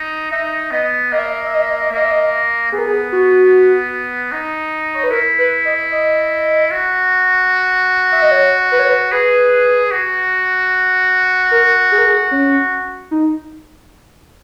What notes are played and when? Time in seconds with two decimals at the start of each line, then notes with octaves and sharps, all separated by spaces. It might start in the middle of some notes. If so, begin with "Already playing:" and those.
Already playing: D#4
0.31 D#4 E5
0.71 B3 D#5
1.12 A#3 D#5
1.19 E5
1.26 D#5
1.33 E5
1.40 D#5
1.47 E5
1.54 D#5
1.61 E5
1.69 D#5
1.76 E5
1.83 D#5
1.91 A#3 E5
1.97 D#5
2.04 E5
2.11 D#5
2.72 B3 G#4
2.79 A#4
2.86 G#4
3.12 F#4
4.32 D#4
4.94 C#5
5.03 B4
5.11 E4 A#4
5.39 B4
5.65 D#5
5.91 D#5
6.71 F#4
8.12 E5
8.22 D#5
8.31 C#5
8.72 B4
8.79 C#5
8.88 B4
9.12 G#4 B4
9.91 F#4
11.51 A#4
11.92 G#4
11.98 A#4
12.06 G#4
12.31 C#4
13.11 D#4